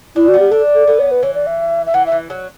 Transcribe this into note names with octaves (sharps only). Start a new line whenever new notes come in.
D4 E4
F#4
B3
G4
D4 A4
A4
B3 A4
C#5
B4
E3 C#5
D5
E5
E5
E3 F#5
E5
E3
F#3